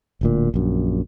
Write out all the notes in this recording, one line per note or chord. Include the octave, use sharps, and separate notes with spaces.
D1 D2 A#2
A#1 F#2